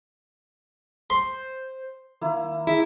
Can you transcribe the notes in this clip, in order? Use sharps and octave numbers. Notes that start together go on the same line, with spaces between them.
C5 C6
D#3 A#3 E4
E4 G#4